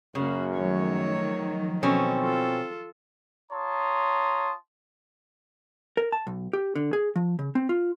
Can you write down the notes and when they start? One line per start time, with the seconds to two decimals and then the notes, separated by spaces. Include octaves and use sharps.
0.15 F#2 C#3 A#3 F#4
0.54 D#3 F3 F#3 A3 C#5
1.83 B2 C4 C#4 A4
2.21 F4 A4
3.52 F4 C#5 A5 A#5 C6 D#6
5.97 A#4
6.12 A5
6.27 B1
6.53 G4
6.76 D3
6.93 G#4
7.16 F3
7.39 C#3
7.55 C4
7.69 F4